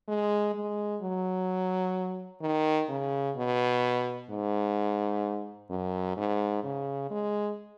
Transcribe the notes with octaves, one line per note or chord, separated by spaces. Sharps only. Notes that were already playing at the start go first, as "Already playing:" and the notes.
G#3
G#3
F#3
D#3
C#3
B2
G#2
F#2
G#2
C#3
G#3